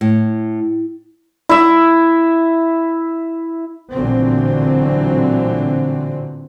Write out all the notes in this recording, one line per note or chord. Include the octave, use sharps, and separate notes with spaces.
A2
E4 E5
A1 A#2 D3 E3 F#3 C4